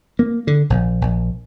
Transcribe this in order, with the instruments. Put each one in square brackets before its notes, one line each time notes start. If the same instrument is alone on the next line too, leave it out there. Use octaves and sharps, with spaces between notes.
[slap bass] A#3
D3
A#1
A#1